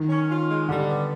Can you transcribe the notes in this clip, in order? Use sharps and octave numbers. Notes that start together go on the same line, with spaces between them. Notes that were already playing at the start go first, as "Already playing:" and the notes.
Already playing: D#3
C#4
F4
G#3
D3 G3
B3